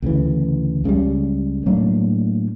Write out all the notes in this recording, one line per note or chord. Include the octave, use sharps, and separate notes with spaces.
D2 C#3 E3
C#2 C#3 E3 G3
A2 F#3 A#3 D4